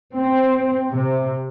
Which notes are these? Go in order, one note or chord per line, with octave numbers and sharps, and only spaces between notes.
C4
C3